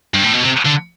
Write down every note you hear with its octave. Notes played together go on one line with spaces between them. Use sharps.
G2
A2
B2
C3
D3